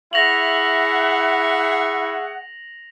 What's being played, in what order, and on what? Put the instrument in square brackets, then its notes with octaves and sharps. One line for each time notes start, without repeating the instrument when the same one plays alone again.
[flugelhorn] E4 [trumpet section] G#4 E5 C#6 [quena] F#5 [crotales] A#6 F7 F#7